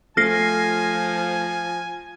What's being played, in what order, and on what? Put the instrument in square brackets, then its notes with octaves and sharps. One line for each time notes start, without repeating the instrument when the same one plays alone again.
[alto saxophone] F3 [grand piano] A3 [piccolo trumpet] G#5 [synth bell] F6 A#6 C7